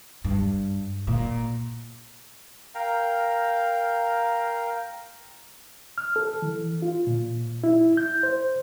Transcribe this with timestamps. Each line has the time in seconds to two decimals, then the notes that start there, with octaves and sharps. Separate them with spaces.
0.24 G2
1.07 A#2
2.75 A#4 F5 G5 A#5
5.98 F6
6.16 A4
6.42 E3
6.82 F4
7.07 A#2
7.64 E4
7.97 G6
8.23 C5